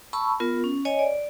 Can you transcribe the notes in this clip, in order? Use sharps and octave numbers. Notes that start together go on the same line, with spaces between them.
A5 B5 C#6 E6
B3 F4 A#4
C#4
C#5 D#5 G#5
D5